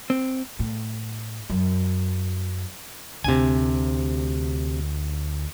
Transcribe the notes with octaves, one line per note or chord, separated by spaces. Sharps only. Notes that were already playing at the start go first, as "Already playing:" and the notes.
C4
A2
F#2
D2 C3 D4 G#5